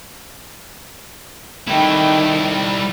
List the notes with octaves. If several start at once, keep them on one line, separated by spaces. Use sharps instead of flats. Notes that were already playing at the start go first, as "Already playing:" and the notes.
D#3 G3 A3 E4 G5